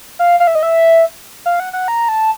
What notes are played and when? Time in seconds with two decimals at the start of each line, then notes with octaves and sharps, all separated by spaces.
0.19 F5
0.40 F5
0.47 E5
0.55 D#5
0.63 E5
1.46 F5
1.60 F#5
1.73 F#5
1.88 A#5
2.09 A5